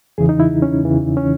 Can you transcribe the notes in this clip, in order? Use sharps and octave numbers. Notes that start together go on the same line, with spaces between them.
E2 C#3 E3 G#4
D#4
E4
C#4
E2 C#3 E3
C#4